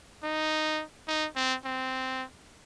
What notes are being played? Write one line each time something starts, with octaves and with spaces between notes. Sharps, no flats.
D#4
D#4
C4
C4